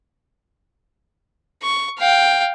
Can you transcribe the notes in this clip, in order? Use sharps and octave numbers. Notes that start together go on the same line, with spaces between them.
C#6
F5 G5